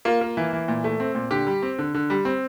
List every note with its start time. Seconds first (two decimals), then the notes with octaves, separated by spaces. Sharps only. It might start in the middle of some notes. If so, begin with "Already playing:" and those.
0.05 A#3 F4
0.21 A#3
0.37 E3
0.53 E3
0.68 A#2
0.84 A3
1.00 C4
1.15 A#2
1.31 D3 G4
1.47 G3
1.62 C4
1.78 D3
1.94 D3
2.10 G3
2.25 C4